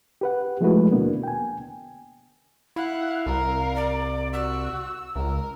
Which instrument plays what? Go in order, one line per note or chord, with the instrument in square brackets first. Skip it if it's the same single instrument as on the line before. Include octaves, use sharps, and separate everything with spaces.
[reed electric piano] G4 B4 F#5
F3 G#3 A3 E4 F#4 B4
D#2 B2 D3 A#3 B3 D4
G5 G#5
[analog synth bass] E4 [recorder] F5 [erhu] F#5
[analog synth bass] C2 [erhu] A#4
[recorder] D5
[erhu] F#4 [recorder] E6
[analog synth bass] C#2 [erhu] A#4